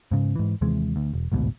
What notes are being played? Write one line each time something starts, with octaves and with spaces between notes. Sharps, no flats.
G#2 C#3
G#2 E3
D#2 C3 E3 G#3
D2
E1
A1 D2 G#2 B2